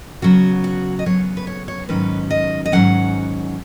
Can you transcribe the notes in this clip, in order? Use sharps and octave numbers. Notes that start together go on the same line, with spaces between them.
C#3 F#3 B3 F#4
F#4
D#5
C#3 F#3 B3 C#5
B4
C#5
C#5
G#2 D#3 F#3 C#4 B4
D#5
D#5
G#2 D#3 F#3 C#4 F#5